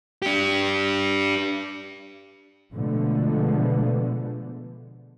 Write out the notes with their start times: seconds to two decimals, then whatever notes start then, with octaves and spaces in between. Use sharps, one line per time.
0.22 D4 G4
2.75 B2 D3 F3 G#3 A3 B3